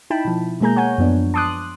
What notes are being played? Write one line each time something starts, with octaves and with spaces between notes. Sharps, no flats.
D#4 E4 G5 A5 B5
B2 F3
B2 G#3 A#3 G#4 A#5 G6
C#5 F#5 G#5 G6
F#2 F3 B3 D4
A5 C6 D6 D#6 F#6